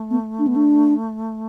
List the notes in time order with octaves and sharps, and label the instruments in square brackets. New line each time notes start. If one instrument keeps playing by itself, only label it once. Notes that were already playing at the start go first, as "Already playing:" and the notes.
Already playing: [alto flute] A3
[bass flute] B3
D4
B3
D4